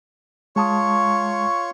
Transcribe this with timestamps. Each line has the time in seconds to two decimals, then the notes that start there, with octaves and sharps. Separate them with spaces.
0.56 G#3 F4 C#5 A5 C#6 D#6